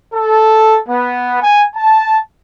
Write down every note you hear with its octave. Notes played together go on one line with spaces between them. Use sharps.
A4
B3
G#5
A5